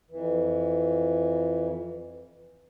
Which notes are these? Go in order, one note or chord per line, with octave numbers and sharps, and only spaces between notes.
F2 E3